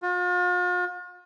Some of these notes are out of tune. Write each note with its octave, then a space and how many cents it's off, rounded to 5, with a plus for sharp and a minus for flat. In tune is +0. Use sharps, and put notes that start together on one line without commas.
F4 +45